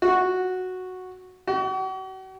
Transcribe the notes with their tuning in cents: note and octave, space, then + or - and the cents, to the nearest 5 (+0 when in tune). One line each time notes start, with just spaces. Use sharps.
F#4 -5
F#4 +40